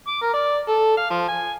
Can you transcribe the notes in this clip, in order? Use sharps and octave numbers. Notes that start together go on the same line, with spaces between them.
D6
A#4
D5
A4
F5
F3
G#5